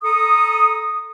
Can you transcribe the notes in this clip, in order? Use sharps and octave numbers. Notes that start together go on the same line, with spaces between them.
A4 A#5 D#6